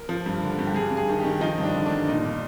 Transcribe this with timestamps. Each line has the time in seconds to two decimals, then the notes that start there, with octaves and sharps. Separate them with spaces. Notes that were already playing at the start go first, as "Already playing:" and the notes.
Already playing: A#4
0.09 F3
0.26 G2
0.43 D3
0.59 G2
0.67 G4
0.74 G2 G#4
0.91 G2
0.97 G#4
1.09 D#3
1.20 D#3 G4
1.41 F3 D#4
1.58 G2
1.63 D4
1.75 D3
1.86 D4
1.91 G2
2.08 A#2 D#4
2.25 A#2